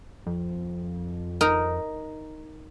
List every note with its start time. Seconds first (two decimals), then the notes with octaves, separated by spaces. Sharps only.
0.27 F2
1.41 D#4 A#4